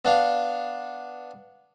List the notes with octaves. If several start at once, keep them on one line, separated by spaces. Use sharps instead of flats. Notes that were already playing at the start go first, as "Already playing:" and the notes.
B3 D4 F5